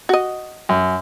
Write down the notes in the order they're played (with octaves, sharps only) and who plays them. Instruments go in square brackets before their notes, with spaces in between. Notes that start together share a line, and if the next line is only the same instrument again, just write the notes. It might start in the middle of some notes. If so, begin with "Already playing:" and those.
[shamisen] F#4 D#5
[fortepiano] F#2